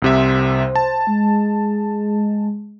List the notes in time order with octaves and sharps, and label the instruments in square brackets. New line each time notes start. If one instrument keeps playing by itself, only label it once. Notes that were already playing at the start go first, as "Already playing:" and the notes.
[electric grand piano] C2 C3 E5 [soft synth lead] C5
[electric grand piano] A5
[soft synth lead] G#3